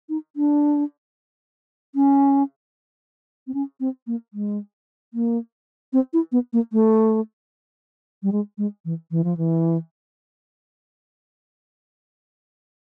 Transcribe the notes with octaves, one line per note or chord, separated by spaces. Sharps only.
D#4
D4
C#4
C4
C#4
C4
A#3
G#3
A#3
C4
E4
B3
A#3
A3
G3
G#3
G#3
E3
E3
F3
E3